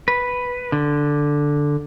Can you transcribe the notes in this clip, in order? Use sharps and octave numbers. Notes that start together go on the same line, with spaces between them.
B4
D3